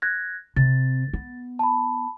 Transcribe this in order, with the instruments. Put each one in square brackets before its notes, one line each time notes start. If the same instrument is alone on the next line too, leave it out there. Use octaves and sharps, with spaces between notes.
[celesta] F#6 G#6 A#6
[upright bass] C3 [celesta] A6
[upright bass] B3
[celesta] A5 B5